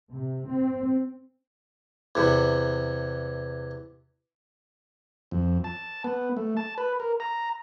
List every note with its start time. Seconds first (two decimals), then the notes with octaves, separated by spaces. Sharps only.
0.10 C3
0.48 C4
2.15 E2 C3
5.31 F2
5.64 A5
6.04 B3
6.37 A3
6.57 A5
6.78 B4
7.00 A#4
7.20 A#5